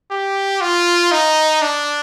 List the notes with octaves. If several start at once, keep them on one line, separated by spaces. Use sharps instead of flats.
G4
F4
D#4
D4